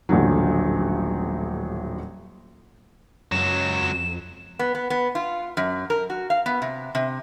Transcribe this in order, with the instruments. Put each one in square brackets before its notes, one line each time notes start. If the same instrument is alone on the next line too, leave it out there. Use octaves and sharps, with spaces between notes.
[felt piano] D#1 A1 D3 F#3
[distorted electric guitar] C#2 F#3 [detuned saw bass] F#2 [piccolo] E7
[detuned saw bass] F2
[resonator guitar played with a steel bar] B3
B3
B3
F4
F#2
A#4
F#4
F5
B3
C3
C3